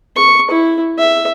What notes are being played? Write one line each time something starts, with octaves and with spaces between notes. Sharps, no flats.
C#6
E4
E5